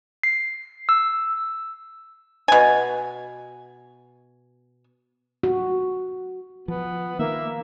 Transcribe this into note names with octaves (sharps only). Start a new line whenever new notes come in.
C7
E6
B2 G#5
F#4
F3 B3
D#3 A#3 E5